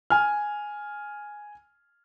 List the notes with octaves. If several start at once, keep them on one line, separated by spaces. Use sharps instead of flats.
G#5 F6